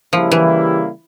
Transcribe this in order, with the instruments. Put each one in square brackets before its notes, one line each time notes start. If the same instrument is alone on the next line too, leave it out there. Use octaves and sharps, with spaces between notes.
[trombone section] C#3 G3 A#3 E4 G4 [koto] F3
[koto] E3